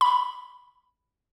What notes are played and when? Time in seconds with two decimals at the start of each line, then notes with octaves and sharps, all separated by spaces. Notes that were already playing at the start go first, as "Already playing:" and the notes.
0.01 B5